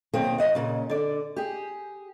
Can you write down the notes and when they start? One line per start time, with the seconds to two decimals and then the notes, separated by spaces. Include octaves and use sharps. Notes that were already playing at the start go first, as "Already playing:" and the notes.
0.13 B2 D#3 F#3 A#3 C4
0.38 F2 D#5 F#5
0.55 A#2 C#3
0.90 D3 D5
1.36 G4 G#4